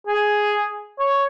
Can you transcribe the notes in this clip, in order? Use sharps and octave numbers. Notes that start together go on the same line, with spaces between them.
G#4
C#5